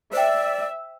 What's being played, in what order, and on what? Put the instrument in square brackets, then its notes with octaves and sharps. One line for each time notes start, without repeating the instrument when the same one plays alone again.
[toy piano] C5 G5 [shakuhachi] D5 [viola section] E5